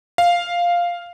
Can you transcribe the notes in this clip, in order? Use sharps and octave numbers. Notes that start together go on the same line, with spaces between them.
F5